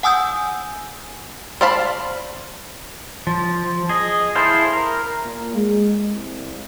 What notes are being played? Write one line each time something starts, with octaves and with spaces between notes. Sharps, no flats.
F#5 G#5 D#6 E6 G6
C5 D5 F5 A5 B5
F3
G#4 D#5
E4 G#4 A4 C5 F5
A#4
A#2
G#3
C2